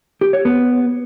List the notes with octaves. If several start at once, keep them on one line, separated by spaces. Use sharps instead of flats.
G4
C#5
B3